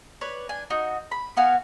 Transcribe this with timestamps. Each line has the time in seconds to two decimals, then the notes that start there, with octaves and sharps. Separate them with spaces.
0.21 B4 C#5 D5
0.49 D4 G#5
0.70 D#4 F#4
1.11 B5
1.37 B3 F#4 F5 G#5